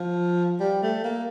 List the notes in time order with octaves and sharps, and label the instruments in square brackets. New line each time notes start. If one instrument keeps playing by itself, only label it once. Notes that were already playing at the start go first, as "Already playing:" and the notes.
Already playing: [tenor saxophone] F3
G3
A3
A#3